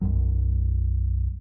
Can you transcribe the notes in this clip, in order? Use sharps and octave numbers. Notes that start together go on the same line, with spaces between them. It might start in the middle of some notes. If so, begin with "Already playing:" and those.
B1 F#2 F#3